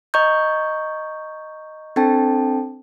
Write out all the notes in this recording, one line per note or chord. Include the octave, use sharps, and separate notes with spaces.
D#5 A#5 C#6 G6
C4 D4 A4 G5 A5